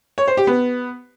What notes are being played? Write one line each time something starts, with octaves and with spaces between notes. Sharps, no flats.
C#5
C5
G4
B3